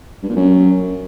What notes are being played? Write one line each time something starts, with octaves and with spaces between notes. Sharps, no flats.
G2
A#2
F#2